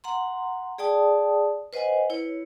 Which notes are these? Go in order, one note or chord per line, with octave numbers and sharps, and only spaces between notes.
F#5 A#5 C6
G#4 D5 G5 A5 D#6
B4 C5 D#5 F#5 G#5
E4 B4 C#5